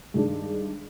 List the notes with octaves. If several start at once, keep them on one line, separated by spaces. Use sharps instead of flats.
G2 D#3 G#3 D4